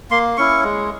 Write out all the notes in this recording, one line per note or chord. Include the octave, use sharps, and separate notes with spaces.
A#3 C6
C#4 E4 C#6
G#3